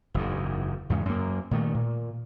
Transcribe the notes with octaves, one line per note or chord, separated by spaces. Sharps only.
F#1 E2 G#2
E2 G#2 C#3
F#2 A#3
A#2 D#3 A3
A#2